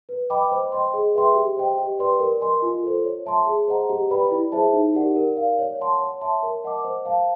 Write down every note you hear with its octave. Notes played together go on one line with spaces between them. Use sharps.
B4
D#5 G5 B5 D6
C5
D#5 G5 C6
G#4
B4 E5 G5 C6
G4
C5 D#5 G5
G4
B4 D5 G5 C6
A#4
D#5 G#5 C6
F4
A4 C5
C#5
E5 A5 C6
G#4
C5 D#5 F#5 A#5
G4
B4 D5 G5 B5
E4
G#4 C5 E5 A5
D#4
G4 A#4 D5 F#5
A#4
D5 F5
C#5
F#5 A5 C6
C#5
E5 A5 C6
A#4
D#5 F#5 A5 D6
C5
F5 A5